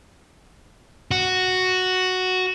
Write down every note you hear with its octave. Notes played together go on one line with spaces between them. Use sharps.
F#4